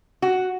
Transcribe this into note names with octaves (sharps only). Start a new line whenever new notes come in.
F#4